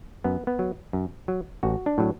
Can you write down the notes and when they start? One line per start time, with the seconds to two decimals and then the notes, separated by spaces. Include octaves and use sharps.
0.24 F#2 B3
0.47 B3
0.59 F#3
0.93 F#2
1.28 F#3
1.63 A1 F#4
1.86 D4
1.98 A2 F#3